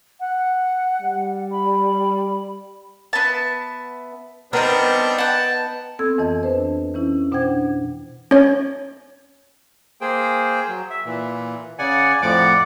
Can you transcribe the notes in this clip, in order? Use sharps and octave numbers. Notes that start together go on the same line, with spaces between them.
F#5
G3
B5
B3 E5 A5
G3 B3 C4 D4 D#4 A#4
F#5 G5 A5
B3 C4 A4 E6 G#6
F2 E3 D#5 A5
D4 B4 C5
E3 C#4 E4
B2 D4 C5 F#5 G5 G#6
C#4 C#5
A#3 G#4 C5 G5
F#3
E5
A#2 E3
C#3 D5 F#5 G#5
F2 A2 F3 D5 F#5 D6